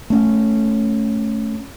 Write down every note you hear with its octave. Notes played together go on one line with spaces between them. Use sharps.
A3 C#4